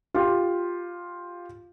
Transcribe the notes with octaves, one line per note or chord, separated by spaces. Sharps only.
F4 G4